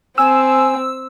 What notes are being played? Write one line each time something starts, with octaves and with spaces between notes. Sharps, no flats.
C4 G#5 E6